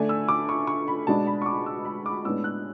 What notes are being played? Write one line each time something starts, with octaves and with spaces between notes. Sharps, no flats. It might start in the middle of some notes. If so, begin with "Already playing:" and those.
Already playing: D3 A3 D4 G#5
E6
D6
C#6
C#6
B5
B2 G#3 D4 A5
B5
C#6
D6
E6
B5
D6
A2 G#3 B3 D4 E6
F#6